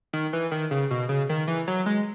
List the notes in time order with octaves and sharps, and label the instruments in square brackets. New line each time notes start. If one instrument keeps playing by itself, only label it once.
[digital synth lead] D#3
E3
D#3
C#3
B2
C#3
D#3
E3
F#3
G#3